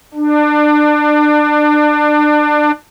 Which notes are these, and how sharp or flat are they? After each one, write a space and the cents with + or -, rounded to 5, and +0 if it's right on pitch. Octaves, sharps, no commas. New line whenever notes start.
D4 +25